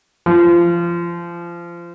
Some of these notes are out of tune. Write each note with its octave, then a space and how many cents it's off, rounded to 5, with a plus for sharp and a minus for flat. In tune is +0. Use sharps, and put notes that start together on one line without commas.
F3 -25